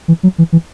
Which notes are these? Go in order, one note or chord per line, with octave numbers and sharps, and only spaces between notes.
E3
F#3
E3
E3